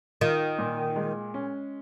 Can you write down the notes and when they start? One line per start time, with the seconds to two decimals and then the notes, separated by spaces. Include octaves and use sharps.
0.21 D#3 F4
0.59 A#2
0.96 G#3
1.34 C#4